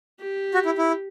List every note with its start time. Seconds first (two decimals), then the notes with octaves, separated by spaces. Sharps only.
0.19 G4
0.54 F#4
0.65 E4
0.78 E4